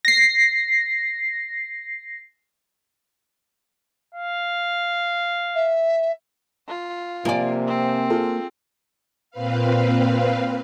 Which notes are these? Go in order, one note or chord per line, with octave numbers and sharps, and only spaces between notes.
A#6 C7
F5
E5
F4
C3 F3 A#3 D5 G#5
C4
F4 G#4 A4
A#2 C4 B4 F5